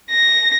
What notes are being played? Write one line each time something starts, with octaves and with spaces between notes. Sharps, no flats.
A#6